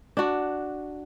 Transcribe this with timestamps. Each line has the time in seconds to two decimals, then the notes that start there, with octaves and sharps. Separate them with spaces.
0.17 D4 F#4